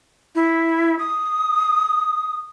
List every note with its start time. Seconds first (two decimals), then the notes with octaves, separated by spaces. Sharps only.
0.35 E4
0.98 D#6